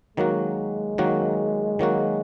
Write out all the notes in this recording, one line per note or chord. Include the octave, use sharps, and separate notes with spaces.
D#3 F#3 G#3 A#3 F#4
D#3 F#3 A#3 F#4
D#3 F#3 A#3 F#4